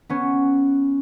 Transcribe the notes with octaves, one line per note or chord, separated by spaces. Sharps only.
B3 C#4